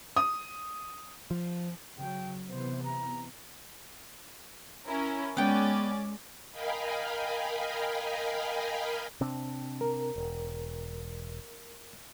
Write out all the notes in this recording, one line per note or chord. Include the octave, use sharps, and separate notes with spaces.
D#6
F3
C#3 F#3 G5
C3 E3 B3 C5
A#5
C#4 E4 A#4
G#3 B3 C#4 D5 G5
A#4 D#5 F5 G5 G#5 B5
C3 C4 D4
A#4
E1